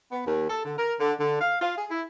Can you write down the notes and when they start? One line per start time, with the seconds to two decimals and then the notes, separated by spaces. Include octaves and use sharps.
0.12 B3
0.26 D#2
0.49 A4
0.65 D3
0.78 A#4
1.00 D3
1.20 D3
1.41 F5
1.62 F4
1.77 G#4
1.90 E4